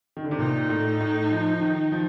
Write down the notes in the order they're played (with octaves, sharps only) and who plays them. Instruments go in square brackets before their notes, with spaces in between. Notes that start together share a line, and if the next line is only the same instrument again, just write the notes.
[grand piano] D#3
D3
C3
[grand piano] A#2 [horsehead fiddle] D#4
[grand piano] A2
A2
F3
D#3
F3